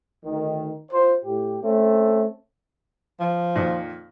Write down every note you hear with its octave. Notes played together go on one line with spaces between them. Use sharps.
D2 D#3
F4 C5
A2 G4
A3 C4 C#4
F3
F2 A#2 D#3